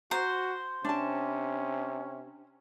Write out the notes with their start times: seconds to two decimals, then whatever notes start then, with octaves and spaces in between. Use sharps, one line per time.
0.11 F#4 C5 A#5
0.85 C3 C#4 D4 A5